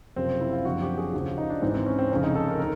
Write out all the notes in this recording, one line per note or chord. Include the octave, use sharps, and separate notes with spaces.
F#1 F2 C3 F3 C4
E4
F4
F#1 F2 D3 F3 F#4
G4
G#4
D#2 C#3 F3 F#4
D#4
D4
G#1 G#2 E3 C4
C4
C#4
C4
F1 F2 C#3 C#4
D#4
A4
A#4
D#3 A#4